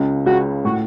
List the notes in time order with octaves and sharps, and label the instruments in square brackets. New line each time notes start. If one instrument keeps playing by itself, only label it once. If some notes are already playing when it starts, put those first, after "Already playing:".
Already playing: [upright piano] C#2 C#3
[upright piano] C#2 C#3 [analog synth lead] F#4
[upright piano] A2 [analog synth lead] F#4